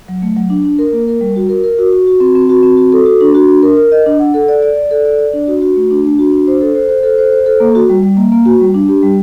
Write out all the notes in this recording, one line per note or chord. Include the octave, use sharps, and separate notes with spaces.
F#3
A3
F#3
D4
D4
A#4
A#3
A#4
G3
F#4
A#4
A#4
F#4
F#4
F#4
C4
C4
F#4
C4
F#4
A4
F#4
D4
F#4
D4
A#4
A#4
D#5
D4
F#5
A4
D5
D5
D5
A4
D5
D5
D4
F#4
F#4
A3
D4
D4
F#4
D4
C5
A4
C5
C5
A4
C5
C5
A4
A#3
F#4
G3
G3
A#3
A#3
F#4
G3
D4
G4
G3